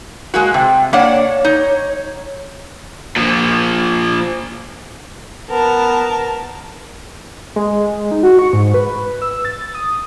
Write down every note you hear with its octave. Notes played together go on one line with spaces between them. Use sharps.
G#3 A#3 F#4
C3 G5
A#3 D4 C#5 F#5
D#4
A#2 F3
B3 A#4 A5
G#3
D#4
F#4
C#6
G#2
B4
E6
A6
D#6